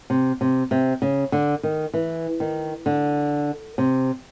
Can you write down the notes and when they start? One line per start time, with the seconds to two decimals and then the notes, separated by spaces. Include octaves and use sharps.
0.10 C3
0.41 C3
0.71 C3
1.02 C#3
1.32 D3
1.63 D#3
1.94 E3
2.40 D#3
2.86 D3
3.78 C3